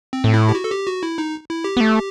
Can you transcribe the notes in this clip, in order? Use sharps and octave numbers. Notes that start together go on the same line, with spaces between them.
C4
A2
E4
G4
F#4
A4
G4
F#4
E4
D#4
E4
G4
B3
A3